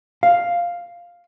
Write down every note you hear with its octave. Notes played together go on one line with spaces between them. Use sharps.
F5